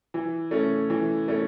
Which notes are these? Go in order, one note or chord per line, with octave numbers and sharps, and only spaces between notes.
E3
A3 C#4
E3
A3 C#4